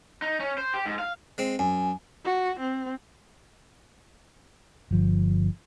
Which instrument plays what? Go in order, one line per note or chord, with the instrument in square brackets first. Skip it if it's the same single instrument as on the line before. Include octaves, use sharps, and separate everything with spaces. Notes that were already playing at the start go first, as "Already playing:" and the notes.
[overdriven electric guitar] D#4
C#4
C5
G4
G#2
F5
[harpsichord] G#3 C4
[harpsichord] F#2 [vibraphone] G#5
[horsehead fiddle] F#4
C4
[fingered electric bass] G1 F3